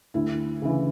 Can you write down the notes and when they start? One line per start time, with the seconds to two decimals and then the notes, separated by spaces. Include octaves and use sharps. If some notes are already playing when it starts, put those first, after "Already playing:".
0.14 D2 E4
0.62 C#3 E3